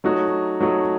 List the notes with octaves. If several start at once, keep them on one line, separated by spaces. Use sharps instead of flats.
F#3 A3 D#4 F#4 C#5
F#3 A3 D#4 F#4 C#5